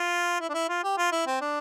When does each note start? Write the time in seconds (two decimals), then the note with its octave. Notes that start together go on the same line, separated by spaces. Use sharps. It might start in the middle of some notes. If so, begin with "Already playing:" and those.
Already playing: F4
0.41 E4
0.49 D4
0.54 E4
0.69 F4
0.84 G4
0.98 F4
1.12 E4
1.27 C4
1.41 D4